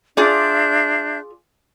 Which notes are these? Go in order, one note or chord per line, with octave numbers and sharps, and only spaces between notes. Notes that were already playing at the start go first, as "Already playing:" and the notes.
D4 F4 G#4 D5 E5 G6